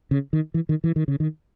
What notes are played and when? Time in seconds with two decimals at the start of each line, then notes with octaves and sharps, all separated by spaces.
0.11 C#3
0.33 D#3
0.54 E3
0.69 D#3
0.84 E3
0.96 D#3
1.08 C#3
1.20 D#3